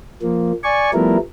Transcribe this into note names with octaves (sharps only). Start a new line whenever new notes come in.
F3 A#3
D5 G#5 C#6
F3 G3 A3 B3 E4 A#4